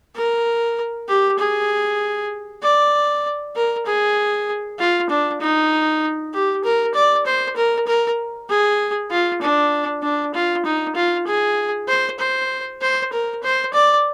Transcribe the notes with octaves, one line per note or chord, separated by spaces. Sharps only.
A#4
G4
G#4
D5
A#4
G#4
F4
D4
D#4
G4
A#4
D5
C5
A#4
A#4
G#4
F4
D4
D4
F4
D#4
F4
G#4
C5
C5
C5
A#4
C5
D5